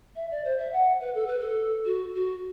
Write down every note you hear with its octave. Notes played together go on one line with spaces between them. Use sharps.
E5
D5
C5
E5
F#5
B4
A4
B4
A4
F#4
F#4